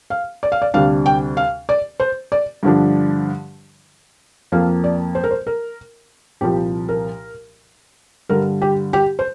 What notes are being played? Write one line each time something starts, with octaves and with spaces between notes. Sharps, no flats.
F5
D5
F5
D5
D2 C3 G3 D4 F5
G5
F5
D5
C5
D5
G2 D3 F3 D4
F2 F3 A#3 F5
D5
C5
A#4
C5
A#4
C2 A#2 F3 G4
A#4
G2 D3 G3 A#4
G4
G4
C5